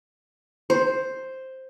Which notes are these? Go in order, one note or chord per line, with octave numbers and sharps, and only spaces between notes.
C5